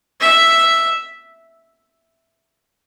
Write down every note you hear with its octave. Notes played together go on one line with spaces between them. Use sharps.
E5